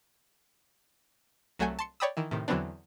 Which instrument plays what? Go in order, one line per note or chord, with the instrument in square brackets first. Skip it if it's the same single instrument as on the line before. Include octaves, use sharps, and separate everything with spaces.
[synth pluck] C2 F#3 A3 F#5 G#5 G6
A5 C6 C#7
C#5 D5 G5 B5 D#6 E6
D#3 E3
A2 C3 D#3
E2 D3 F#3 B3 C4 D4